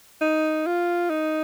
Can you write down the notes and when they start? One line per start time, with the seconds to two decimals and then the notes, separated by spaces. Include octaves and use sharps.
0.21 D#4
0.66 F4
1.10 D#4